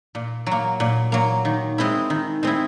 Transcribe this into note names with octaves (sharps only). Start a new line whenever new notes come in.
A#2
F#3 A#3
A#2
F#3 A#3
D#3
G#3 C4 E4
D#3
G#3 C4 E4